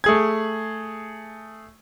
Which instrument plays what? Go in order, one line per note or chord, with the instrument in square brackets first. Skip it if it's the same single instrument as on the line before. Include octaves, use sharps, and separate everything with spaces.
[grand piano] A3 G#4 G#6